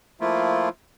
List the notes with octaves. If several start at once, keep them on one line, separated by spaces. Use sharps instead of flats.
F3 A3 A#3 E4 F4